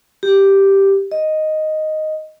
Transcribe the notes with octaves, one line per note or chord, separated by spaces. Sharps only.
G4
D#5